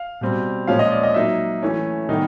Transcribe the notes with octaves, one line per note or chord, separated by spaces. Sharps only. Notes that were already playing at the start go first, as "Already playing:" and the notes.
Already playing: F5
B2 G3 C4
A#2 F3 G#3 C#4 F5
D#5
D5
D#5
F#3 A#3 D#4 E5
E3 A3 C#4
D#3 G3 B3 D#4